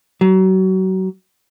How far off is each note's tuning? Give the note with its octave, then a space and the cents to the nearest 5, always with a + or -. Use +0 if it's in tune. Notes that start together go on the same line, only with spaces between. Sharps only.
F#3 +30